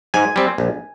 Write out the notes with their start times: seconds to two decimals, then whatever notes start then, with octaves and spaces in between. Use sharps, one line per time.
0.14 G#2 G#5
0.36 G3 C4
0.58 A#1